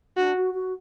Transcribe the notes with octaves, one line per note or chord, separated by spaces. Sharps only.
D4 F#4
F#4
F#4